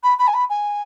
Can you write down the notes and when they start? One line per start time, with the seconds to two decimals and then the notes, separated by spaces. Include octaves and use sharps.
0.03 B5
0.19 B5
0.27 G#5
0.34 B5
0.49 G#5